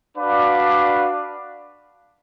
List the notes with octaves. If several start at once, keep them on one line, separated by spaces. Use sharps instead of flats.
D4 F#4 B4 D5 F5